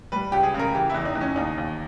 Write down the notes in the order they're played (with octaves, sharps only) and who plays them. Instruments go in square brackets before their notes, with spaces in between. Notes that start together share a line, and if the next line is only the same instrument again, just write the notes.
[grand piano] G3 B4
C#2 G4
G#4
C#3
A#4
E3 G4
E2 E4
D#4
E2
C#4
D#2 D#4
D#2